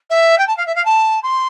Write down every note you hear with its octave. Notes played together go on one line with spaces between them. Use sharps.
E5
G5
A5
F5
E5
F5
A5
C6